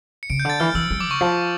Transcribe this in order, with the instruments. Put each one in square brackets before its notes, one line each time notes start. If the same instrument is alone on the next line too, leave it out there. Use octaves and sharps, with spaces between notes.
[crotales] C#7
[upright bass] C#3 [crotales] D7
[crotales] G6
[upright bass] D3 [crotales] A6
[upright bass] E3 [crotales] F6
[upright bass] E3 [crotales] E6
[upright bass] G3
[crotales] D6
[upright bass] C#3 [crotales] C#6
[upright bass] F3